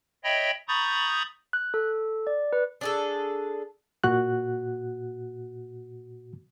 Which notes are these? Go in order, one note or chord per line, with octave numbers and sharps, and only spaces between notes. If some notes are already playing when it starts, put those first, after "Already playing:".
C#5 D#5 E5 G5 B5
A#5 B5 C#6 D#6 G6 A6
F#6
A4
D5
B4
D4 G#4 A4
A#2 F#4 F#6